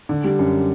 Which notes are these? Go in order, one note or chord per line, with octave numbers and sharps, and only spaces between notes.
D3
G3
F#2